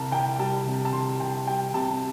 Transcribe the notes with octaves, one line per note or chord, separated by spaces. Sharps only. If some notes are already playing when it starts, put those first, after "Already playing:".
Already playing: C2 C3 G3 A5
C2 G5
G3 A5
C3
A5
C2 C6
C2 G5
G3 G5
C3 A5